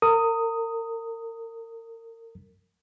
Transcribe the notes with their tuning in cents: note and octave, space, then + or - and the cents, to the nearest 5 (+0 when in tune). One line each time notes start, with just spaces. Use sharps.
A#4 -35 D#6 +5